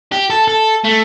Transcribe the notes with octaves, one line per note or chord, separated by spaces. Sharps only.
G4
A4
A4
A3